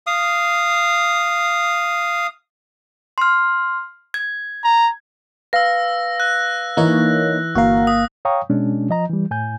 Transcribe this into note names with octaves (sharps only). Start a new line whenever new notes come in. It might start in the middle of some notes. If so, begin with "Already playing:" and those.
F5 D#6
C6 F6
G#6
A#5
B4 F5 E6 A#6
F#6
E3 A#3 D#4 C#5
G1 A#3 F#4 A#4 F5
D#6
C#5 F5 G5 A#5 C#6 D#6
B2 G#3 C#4 D4
F3 D#5 A#5
E3 G3
A2 G#5 G6